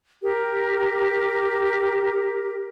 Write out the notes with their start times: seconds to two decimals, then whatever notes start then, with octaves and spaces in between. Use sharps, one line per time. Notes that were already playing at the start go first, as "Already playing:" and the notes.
0.23 G4 A#4